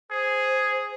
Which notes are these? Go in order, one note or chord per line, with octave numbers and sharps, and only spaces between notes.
G#4 C5